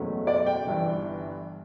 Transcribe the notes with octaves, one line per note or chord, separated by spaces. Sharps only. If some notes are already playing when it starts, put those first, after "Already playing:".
Already playing: F#1 E2 B2 A3 C#4
D5
G5
G1 G2 E3